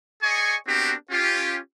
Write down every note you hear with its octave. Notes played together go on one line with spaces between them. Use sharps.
G#4 D5 D#5 G#5 C#6
B3 C4 D4 F#4 G4 A#4
C#4 F4 G4